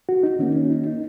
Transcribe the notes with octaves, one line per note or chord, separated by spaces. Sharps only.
F#4
D#4
D#3 A#3 C#4
C#4
D#4
D#4